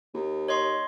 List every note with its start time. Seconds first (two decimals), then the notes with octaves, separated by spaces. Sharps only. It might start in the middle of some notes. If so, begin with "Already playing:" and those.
0.14 D#2
0.48 C#5 D#5 C6